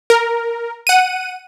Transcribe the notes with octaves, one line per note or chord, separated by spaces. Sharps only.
A#4
F#5 D#7